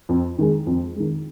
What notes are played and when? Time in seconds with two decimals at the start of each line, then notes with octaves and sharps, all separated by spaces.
0.09 F2
0.38 D#3 G#3
0.67 F2
0.96 D#3 G#3